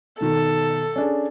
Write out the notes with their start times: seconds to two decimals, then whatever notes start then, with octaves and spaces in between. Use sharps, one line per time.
0.21 B2 D#3 A4
0.96 C#4 D4 G#4